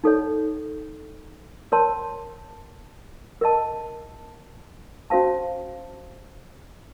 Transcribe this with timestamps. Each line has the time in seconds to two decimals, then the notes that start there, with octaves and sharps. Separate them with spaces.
0.04 D#4 A4 C#5
1.72 A#4 C#5 A5 C6
3.41 A#4 D#5 A5
5.10 C#4 F#4 C5 F5 A5